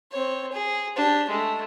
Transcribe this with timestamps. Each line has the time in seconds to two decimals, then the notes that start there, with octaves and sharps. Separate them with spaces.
0.12 C4 C#5
0.52 G#4
0.96 D4 G4
1.30 G#3 A3